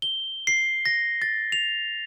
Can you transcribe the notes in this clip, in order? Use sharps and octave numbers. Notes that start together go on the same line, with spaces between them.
G7
C7
A#6
A6
F7